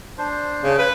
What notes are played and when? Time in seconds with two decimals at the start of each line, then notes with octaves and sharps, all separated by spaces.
0.18 D4 C5
0.64 C#3
0.79 B4